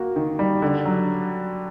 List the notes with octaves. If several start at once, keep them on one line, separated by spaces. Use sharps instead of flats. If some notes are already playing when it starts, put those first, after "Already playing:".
Already playing: A#3 F#4
D#3
G3
D3
F#3